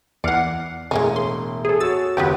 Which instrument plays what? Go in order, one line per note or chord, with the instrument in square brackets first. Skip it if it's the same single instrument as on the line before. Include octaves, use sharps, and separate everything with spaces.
[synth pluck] E2 F#5 [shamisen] E3 D5 [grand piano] F6 C7 C#7
[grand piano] E1 A2 [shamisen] G#3 A#3 C#4
[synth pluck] C6
G#4 A4
[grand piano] F#4 C#5 [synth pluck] E6 A6
[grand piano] F#1 D#2 [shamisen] F3 F#3 B3 [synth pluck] G4 B4